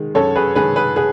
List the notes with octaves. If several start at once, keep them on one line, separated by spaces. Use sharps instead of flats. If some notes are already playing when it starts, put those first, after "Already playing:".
Already playing: D#3 G#3
F#2 A4 C#5
G#4 B4
D#3 G#3 G#4 B4
G#4 B4
G#4 B4